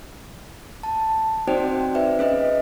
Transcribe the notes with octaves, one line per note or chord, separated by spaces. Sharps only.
A5
C4 D#4 F#4 C5 D5 G5
B4 D5 E5
C#4 G#4 B4 D#5